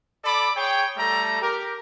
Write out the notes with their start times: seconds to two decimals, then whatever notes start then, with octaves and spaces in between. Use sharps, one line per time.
0.24 A4 D5 B5 D6
0.56 G#4 C#5 G5
0.97 G3 A3 A4 A#5
1.42 G4 A#4